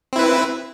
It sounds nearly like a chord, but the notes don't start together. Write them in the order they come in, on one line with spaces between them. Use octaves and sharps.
C4 E4 B4